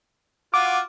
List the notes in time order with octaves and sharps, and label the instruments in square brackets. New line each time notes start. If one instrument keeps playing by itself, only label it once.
[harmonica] F4 F#4 [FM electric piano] D6